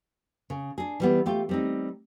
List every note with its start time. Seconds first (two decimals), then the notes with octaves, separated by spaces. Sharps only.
0.50 C#3
0.78 D4 G#4
1.00 E3 G3 B3
1.26 A3 F4 G4
1.49 G3 C4 D#4